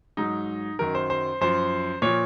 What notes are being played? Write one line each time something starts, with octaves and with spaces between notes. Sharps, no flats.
G#2 F#3 D#4
F#2 D#3 F#3 A#4
C5
C5
F#2 F3 C5
A#2 F3 C#5